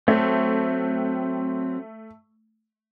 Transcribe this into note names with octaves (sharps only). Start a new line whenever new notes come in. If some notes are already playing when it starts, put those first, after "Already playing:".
F#3 A3 C4